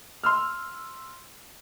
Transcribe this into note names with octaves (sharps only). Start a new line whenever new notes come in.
C6 E6 F6